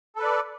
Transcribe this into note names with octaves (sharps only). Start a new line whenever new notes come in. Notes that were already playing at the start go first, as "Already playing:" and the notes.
A4 B4 D5